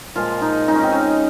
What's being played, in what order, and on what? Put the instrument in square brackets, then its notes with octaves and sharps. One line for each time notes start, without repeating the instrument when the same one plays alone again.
[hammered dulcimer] A#2 F3 G#3 F4
D#4
C#3 G#3 D#4
C#4
C4
C#4